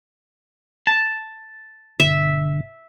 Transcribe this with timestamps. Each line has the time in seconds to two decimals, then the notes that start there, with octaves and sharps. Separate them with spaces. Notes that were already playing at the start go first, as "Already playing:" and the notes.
0.87 A5
2.00 G1 B2 D3 E5